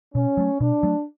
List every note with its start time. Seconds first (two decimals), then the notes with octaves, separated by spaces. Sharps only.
0.15 B2 C#4
0.37 F#3 A3
0.60 B2 D4
0.83 F#3 A3